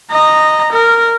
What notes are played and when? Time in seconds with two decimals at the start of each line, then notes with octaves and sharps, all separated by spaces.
0.11 D#5 A#5
0.73 A#4